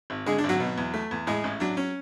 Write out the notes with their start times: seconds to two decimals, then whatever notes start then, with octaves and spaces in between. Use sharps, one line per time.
0.10 G#1
0.26 D3 G#3 G#4
0.38 D4
0.44 G#1
0.49 F#3 F#4
0.60 B2
0.78 E2
0.94 A3
1.11 E2
1.27 A2 G#3 G#4
1.44 A1
1.60 F#3 D4
1.77 C#4